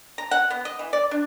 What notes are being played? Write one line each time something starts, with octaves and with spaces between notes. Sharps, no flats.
A#5
F#5
B3
D#5
E3
D5
D4